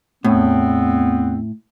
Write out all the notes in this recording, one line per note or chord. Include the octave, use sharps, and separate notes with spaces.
E2 A2 B3 C4